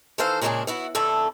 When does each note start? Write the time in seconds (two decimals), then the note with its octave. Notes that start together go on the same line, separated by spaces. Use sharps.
0.18 D#3 E3 A4 C5 F5
0.41 A#2 C#3 G#3 A#3 D4 G#4
0.67 B3 E4 F#4
0.95 F2 D3 A3 E4 A4